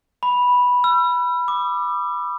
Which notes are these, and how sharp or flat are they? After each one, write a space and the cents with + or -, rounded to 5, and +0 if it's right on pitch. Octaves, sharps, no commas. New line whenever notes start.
B5 -5
E6 +40
D6 +20